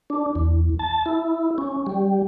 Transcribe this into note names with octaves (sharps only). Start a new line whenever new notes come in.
D4
E2
A5
E4
C#4
G3